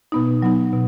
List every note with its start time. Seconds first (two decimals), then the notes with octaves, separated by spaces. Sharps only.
0.12 B2 B3 D#4
0.42 F#3 B3 D#4
0.72 B2